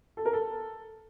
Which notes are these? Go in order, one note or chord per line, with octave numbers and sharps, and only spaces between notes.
A4
A#4
A4